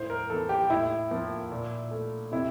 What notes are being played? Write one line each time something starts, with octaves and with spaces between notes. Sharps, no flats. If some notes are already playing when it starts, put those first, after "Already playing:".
Already playing: A2 C5
A#4
E3 A#3 A4
G4
A2 E4
F3 A#3
A#2
A3
C3 E4